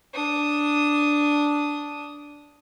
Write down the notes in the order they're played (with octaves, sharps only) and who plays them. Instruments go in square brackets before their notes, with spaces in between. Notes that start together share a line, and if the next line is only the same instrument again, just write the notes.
[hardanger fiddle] D4 D#6